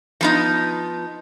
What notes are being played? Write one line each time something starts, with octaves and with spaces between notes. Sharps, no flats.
F3 B3 D#4